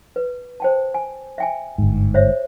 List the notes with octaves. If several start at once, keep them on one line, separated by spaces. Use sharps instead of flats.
B4
C5 G5 A5
G#5
E5 G5 G#5
G1 G#2
C5 C#5 E5